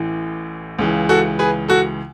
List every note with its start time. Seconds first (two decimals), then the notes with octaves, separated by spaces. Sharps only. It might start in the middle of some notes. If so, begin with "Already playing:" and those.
Already playing: A1 A2 E3
0.79 C#2 C#3 E3
1.09 F#4 A4
1.39 G#4 B4
1.68 F#4 A4